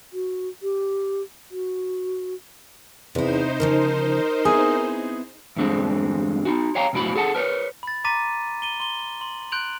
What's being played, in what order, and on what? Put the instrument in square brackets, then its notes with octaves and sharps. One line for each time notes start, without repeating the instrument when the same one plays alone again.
[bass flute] F#4
G4
F#4
[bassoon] E2 [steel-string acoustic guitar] C3 E4 [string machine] D#4 C5
[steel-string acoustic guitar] D2 C#3 F3 [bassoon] A#4
[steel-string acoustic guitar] B3 C4 E4 [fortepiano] G#4
[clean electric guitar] E2 G2 D3 G#3 C4
D#4 F#4
C#5 F5 G5 A#5
B1 F2 A2 E4 F#4 B5
G#4 A4 F#5 A5
A#4 B4 C#5
[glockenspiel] B5 A6
A#5 C6 D6 A6 B6 D#7
D#7 G7
C6 G7
C6 F#7
C6 F#6 G6 D7 F7 F#7